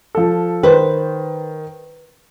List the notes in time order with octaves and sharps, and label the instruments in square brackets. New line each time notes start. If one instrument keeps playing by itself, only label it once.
[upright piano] F3 A4
[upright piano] D#3 [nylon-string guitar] B4 C5